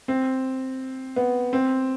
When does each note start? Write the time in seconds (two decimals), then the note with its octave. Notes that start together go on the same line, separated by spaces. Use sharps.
0.08 C4
1.16 B3
1.53 C4